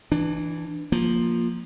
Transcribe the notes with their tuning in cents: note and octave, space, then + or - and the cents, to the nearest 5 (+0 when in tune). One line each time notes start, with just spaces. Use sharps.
E3 +0 D4 +15
F3 +0 A#3 +0